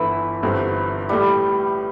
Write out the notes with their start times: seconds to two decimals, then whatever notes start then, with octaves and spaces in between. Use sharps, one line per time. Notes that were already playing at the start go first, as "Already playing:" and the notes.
Already playing: G1 G2 D3 E3
0.43 G1 G2 D3 G3 C4
1.09 A2 G3 A3 E4